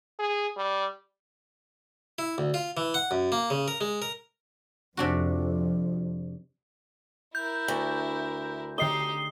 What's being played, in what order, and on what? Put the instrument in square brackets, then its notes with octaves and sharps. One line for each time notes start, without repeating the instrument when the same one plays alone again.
[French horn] G#4
G3
[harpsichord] E4
D2
F4
E3
F#5
F#2
A#3
C#3
A#4
G#3
A#4
[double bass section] F2 [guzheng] C3 D4 F#4
[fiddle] E4 A#4 [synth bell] G6
[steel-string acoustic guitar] D2
[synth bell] D3 C7 G7 [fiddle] D#4 G4 [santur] D#5